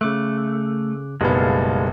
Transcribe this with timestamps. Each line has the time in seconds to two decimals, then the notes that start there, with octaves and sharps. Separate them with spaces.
0.01 C#3 A3 D6 F#6
1.21 F#1 B1 G3 G#3 B3 A4 F5